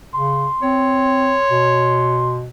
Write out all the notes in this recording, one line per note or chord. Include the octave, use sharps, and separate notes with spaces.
C#3 C6
C4 C#5
B2